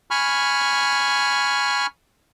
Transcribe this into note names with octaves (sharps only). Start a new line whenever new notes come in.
G#5 B5 C#6 F6